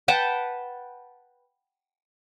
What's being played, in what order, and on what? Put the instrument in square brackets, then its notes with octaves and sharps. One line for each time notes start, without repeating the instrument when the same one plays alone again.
[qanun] B4 F#5 G5 A5